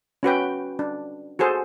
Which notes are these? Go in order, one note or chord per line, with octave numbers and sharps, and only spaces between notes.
C#4 F#4 B4 G5
D4
F#4 G#4 A4 C5